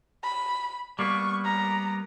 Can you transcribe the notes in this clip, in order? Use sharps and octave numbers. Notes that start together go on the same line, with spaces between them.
B5
G3 A#3 B3 C#6
A#5